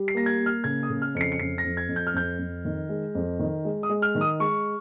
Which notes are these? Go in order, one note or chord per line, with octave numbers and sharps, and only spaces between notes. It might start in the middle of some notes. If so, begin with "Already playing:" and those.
Already playing: G3
C7
A#3 A#6
G#6
A#3
F6
C#3 G#6
D#6
C#3
F6
F2 C#7
C7
C#7
F2 C7
A#6
F2
G#6
F2
G6
F6
F2 G6
F2
D#3
G#3
F2
D#3
G#3
D#6
G#3
F6
D#3
D#6
G#3 C#6